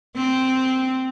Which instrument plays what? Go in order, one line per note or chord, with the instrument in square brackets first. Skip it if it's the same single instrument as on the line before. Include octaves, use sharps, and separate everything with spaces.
[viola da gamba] C4